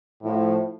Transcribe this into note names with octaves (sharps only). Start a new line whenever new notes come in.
A2 F3 A3